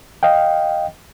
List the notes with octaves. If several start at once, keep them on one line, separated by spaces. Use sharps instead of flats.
D#5 F5 G5